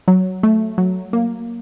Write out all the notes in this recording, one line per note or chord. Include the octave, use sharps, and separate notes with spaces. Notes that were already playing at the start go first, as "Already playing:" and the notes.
F#3
A3
F#3
A#3